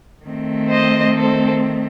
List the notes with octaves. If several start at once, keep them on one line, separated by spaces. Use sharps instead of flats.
D#3 A3 C4
C5 D#5
A4 C5